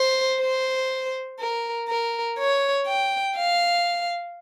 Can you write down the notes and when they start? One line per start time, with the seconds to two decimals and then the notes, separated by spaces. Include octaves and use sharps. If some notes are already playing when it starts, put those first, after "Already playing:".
Already playing: C5
0.40 C5
1.39 A#4
1.88 A#4
2.38 C#5
2.87 G5
3.36 F5